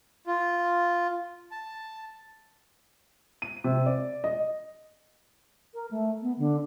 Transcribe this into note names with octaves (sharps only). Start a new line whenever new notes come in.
F4
A5
D#7
C3
D5
D#5
A#4
A3
B3
D3